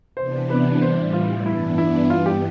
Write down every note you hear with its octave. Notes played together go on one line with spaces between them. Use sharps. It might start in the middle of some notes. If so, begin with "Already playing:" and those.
C3 E3 B3 D4 C5
B4
A2 E3 G3 C5
F4
G2 E3 B3 D4 E4
E4
G2 E3 B3 F4
G4